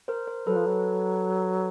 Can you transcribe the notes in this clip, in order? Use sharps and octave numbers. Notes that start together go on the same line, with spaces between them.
A#4 C5
A#4 C5
F#3 A4 B4
F3
F#3